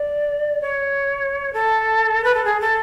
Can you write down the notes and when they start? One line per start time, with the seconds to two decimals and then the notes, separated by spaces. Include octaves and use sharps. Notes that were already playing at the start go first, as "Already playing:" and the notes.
Already playing: D5
0.62 C#5
1.53 A4
2.24 B4
2.34 A4
2.45 G#4
2.60 A4